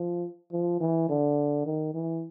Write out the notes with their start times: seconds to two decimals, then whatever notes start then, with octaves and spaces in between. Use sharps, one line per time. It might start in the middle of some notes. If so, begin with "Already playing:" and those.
Already playing: F3
0.52 F3
0.81 E3
1.09 D3
1.66 D#3
1.94 E3